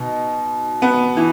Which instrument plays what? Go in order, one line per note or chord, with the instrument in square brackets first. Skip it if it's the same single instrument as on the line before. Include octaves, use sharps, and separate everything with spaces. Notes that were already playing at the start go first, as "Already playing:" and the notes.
Already playing: [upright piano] B2 [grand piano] D#4
[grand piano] B3
E3